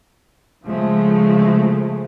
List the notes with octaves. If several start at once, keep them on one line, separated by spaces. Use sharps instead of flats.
C#3 F3 G#3 A3